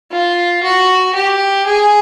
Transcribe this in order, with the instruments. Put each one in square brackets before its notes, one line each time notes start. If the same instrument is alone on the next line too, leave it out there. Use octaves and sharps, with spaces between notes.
[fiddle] F4
F#4
G4
G#4